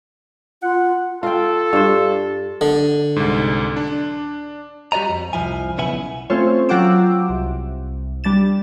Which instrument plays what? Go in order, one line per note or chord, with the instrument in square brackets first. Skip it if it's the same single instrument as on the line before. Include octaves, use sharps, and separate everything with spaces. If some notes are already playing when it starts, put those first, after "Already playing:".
[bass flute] F4 [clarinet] F#5
[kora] F4 G5 [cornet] A4
[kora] G2 C5
[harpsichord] D3
[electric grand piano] C2 G#2
D4
[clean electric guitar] G3 F#4 D5 D#5 A#5
F2
C2 F2 C3 F3 E4 G#5
B1 C#3 B3 E4 G#5
[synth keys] A3 C4 C#4 F4 C5 C#5
F#3 F4 F#5 G5 D6 E6
C2
G3 D4 A6 E7